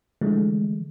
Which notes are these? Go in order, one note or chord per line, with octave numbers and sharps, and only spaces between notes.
D3 E3 F3 G#3 A3